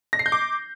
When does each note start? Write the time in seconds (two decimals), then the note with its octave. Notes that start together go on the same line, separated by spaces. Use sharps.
0.13 A#6
0.19 C7
0.26 G6
0.32 D6